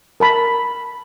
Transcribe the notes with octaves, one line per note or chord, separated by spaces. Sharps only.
A#4 A5 B5